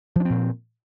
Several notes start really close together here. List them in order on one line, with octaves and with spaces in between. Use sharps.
F3 D4 C4 A#2